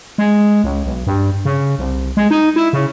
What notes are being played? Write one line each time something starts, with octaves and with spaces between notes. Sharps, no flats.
G#3
C#2
B1
G2
C#3
C2
G#3
D#4
E4
C#3